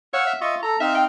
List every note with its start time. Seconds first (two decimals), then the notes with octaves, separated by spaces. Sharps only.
0.14 C#5 F5 F#5 E6
0.27 E5
0.41 F4 D#5 E5 C#6
0.63 A4 A#5
0.80 C4 D#4 E5 F5
0.95 G5